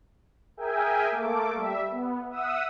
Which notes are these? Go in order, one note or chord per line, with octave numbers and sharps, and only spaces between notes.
G#4 A#4 E5 G5 G#5
A3 A#3 A4 D6
G3 E5
B3
E5 F#5 D#6 E6